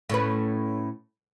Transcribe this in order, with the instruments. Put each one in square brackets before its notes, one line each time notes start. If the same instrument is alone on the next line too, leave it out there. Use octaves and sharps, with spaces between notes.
[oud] A2 C#4 B4